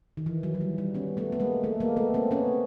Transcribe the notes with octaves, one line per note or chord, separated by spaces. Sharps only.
D#3
E3
F#3
F#3
G3
G3
B3 C#4
A3 B3
B3
G#3 A#3
A3
G#3 A#3
A3 B3
A#3 C4
B3 C#4